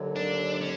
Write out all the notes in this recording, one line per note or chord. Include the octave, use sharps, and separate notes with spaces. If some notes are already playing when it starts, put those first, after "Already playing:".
Already playing: D#2 D3 F#3
D4
C#4